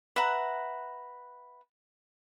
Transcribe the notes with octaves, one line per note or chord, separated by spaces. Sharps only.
B4 E5 F#5 A#5